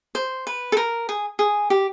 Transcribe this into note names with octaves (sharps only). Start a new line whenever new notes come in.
C5
B4
A4
A#4
G#4
G#4
G4